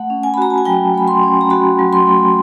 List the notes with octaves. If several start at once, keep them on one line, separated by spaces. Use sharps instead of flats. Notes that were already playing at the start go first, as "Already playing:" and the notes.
Already playing: A3 F#5
C#4
G#5
B5
F#4 A#5
A5
G#5
F#3 G5
A3 B5
C6
C#4
A#5
F#4 B5
F#3
C6
A3